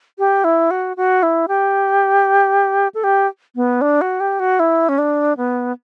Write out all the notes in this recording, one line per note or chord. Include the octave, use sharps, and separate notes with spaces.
G4
E4
F#4
F#4
E4
G4
A4
G4
B3
D4
F#4
G4
F#4
E4
C#4
D4
B3